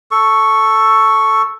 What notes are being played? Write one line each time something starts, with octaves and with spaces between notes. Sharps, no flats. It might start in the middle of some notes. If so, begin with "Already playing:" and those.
A4 C#6